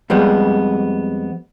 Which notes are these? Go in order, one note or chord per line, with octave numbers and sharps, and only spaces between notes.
F2 G3 G#3 B3